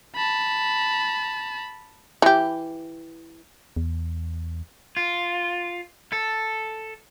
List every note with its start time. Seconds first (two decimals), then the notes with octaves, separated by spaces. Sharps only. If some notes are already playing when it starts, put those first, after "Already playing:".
0.15 A5 B5
2.22 E3 G4
3.76 E2
4.97 F4
6.12 A4